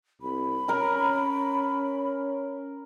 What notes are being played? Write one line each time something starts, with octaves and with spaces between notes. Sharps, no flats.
C2 B5
C#4 A#4 A#5